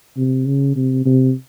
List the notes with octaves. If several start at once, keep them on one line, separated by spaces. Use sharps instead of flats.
C3
C#3
C3
C3